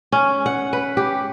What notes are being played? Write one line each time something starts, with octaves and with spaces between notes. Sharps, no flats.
C#4
F#5
B4
G4